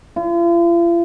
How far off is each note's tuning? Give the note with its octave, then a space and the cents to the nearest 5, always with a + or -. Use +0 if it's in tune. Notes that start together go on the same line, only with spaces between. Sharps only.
F4 -45